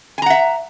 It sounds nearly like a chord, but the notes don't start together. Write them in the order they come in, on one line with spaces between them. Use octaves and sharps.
G#5 A#5 F#5 E5